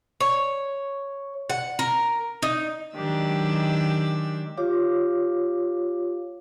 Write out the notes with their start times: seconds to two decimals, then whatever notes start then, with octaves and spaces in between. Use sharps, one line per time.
0.20 C#5
1.50 F#5
1.79 A#4
2.43 D#4
2.96 D#3 F#3 G#3 D4 G4 E6
4.57 F4 G4 C#5 F5 D6